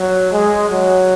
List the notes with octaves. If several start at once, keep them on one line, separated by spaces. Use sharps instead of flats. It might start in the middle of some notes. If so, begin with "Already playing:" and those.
Already playing: F#3
G#3
F#3